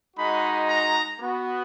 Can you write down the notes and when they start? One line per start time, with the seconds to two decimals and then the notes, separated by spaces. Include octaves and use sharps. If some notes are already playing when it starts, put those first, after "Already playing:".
0.16 G#3 D#4 F#4 B5
0.67 A#5
1.19 B3 F#4